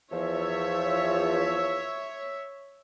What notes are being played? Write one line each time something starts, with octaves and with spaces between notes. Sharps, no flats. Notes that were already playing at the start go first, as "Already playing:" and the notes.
E2 F3 C#5 E5